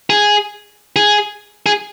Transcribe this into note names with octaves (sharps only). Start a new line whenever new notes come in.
G#4
G#4
G#4